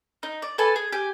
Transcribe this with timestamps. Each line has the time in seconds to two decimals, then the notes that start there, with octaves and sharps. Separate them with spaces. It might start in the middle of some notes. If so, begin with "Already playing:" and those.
0.23 D#4
0.42 D5
0.58 A4 B4 G#5 A5
0.76 G#4
0.93 G4 G#5